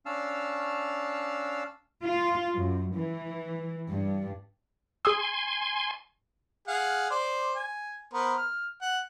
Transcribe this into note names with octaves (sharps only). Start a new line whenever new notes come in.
C#4 D4 F5 A5 E6 F6
F4
F#2
E3
G2
G#4 G#5 C6 D#6 E6
G#4 F5 F#5
C5 D5
G#5
B3 A#4 C5
F6
F#5